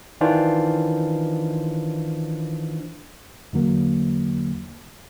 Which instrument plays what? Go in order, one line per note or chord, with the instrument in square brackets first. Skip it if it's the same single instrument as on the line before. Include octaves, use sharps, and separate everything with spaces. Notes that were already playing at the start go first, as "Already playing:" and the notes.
[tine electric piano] D#3 E3 D4 F4 C5
[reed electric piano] E2 D3 F#3 A#3